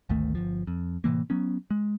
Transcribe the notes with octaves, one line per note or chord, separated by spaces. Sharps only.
G#1 D2 D#3 A3
G1 F3
F2
A2 C3 E3 A#3
F#3 B3 C#4
G#3